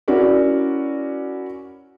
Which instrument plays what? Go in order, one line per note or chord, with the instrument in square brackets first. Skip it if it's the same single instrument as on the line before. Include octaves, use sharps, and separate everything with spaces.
[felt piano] C#4 E4 F#4 A#4 D5